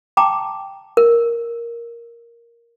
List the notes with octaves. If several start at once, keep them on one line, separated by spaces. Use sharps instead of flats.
G5 A5 A#5 D6
A#4